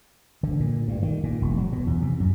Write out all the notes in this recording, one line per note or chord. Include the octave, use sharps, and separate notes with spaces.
D3
A#2
G2
D#3
A#2
E1
F#3
B2
E2
C3
F#2